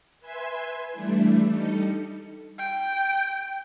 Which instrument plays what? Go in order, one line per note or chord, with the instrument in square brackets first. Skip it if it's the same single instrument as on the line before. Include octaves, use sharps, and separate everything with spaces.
[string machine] B4 E5 G#5 C6 E6 G#6
E3 G3 A3 D4 E4
G3 D#4 A4 C#7
[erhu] G5